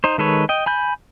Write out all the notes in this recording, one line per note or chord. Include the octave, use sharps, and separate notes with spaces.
D#4 C5
D#3 G#3 A4 B4 C#5
D#5 G5
G#5 B5 G6